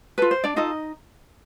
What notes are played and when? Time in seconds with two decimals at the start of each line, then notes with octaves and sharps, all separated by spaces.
0.18 F4 A4 B4
0.31 C5
0.44 D4 D5
0.56 D#4 F4 A4 D#5